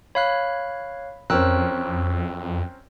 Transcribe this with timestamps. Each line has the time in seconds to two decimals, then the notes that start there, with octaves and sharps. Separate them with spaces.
0.15 C#5 F5 B5 F#6
1.30 F2 C4 C#4 A#4 G5 E6 F#6